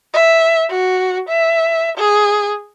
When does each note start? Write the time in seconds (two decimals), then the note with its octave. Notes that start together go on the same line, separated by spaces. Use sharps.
0.13 E5
0.70 F#4
1.29 E5
1.98 G#4